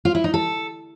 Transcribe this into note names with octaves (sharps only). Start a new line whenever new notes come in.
F4
E4
D#4
A4